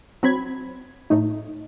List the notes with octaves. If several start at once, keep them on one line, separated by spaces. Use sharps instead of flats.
F#3 C4 B5 G#6
A2 A3 D#4